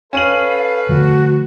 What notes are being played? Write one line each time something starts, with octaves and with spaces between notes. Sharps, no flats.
C#4 A4 B4 F5 D#7 F#7
D3 F3 A3 F#4